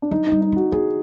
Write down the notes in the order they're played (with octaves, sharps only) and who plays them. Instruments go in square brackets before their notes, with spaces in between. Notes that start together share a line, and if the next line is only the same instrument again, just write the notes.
[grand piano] D4
[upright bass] F#3 [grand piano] D#4
[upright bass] G3 [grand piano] D#4
[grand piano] D#4
[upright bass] C4 [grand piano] F#4
[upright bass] B3 [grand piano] G#4